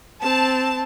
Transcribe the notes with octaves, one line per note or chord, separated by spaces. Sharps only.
C4 A5